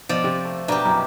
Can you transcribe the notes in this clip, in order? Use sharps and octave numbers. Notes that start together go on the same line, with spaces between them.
B2 F3 D5
C3
A3
B2 A#3 B3 D4 G4 A#4
F#2 C3 D#3 E4